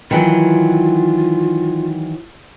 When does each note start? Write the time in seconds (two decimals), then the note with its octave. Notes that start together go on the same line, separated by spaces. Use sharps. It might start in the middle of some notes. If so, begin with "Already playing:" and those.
0.11 D#3 E3 F#3 F4